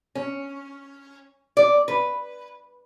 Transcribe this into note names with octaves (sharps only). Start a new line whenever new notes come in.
C#4
D5
B4